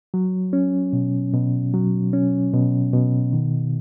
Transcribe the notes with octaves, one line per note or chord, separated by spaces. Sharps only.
F#3
C#4
B2
B2
F#3
C#4
B2
B2
D#3